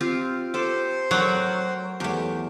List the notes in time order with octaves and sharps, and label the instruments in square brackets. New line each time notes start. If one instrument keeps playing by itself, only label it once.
[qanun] C4 F4 G4
[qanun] G4 A4 [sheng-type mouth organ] C5
[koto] F#3 [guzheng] A3 [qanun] A#4 F#5 G5
[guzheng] E2 A3 [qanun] G4